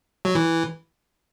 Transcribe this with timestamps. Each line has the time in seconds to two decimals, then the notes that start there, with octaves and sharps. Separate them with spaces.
0.25 F#3
0.35 E3